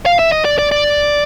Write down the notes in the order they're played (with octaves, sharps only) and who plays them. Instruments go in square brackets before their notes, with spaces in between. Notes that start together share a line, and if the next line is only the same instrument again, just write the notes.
[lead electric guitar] F5
E5
D#5
D5
D5
D5